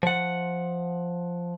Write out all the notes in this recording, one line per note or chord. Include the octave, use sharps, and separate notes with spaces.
F3 F#5